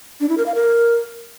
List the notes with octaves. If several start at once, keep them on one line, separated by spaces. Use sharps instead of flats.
D4
E4
A#4
F5
A#4